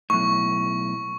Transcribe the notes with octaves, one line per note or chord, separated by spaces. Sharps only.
B1 A2 C#6